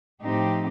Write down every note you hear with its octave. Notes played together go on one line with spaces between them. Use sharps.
A2 F3 C4 D#4 G4